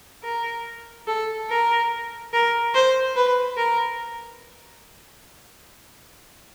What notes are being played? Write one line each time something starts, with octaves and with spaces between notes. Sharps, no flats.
A#4
A4
A#4
A#4
C5
B4
A#4